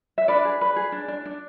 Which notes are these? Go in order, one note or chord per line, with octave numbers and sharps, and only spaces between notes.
E5
D4 B4 D5
G#4
B4
G#4
D4
D4
D4